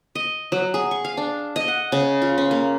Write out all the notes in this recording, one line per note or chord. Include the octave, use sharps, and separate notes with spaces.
D#5
F#3
G#4
C#6
F5
D4
D#5
F#5
C#3
F4
C#4
A#3